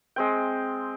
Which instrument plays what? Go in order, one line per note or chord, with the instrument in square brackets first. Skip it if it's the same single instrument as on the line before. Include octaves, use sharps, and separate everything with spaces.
[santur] G#3 C4 G5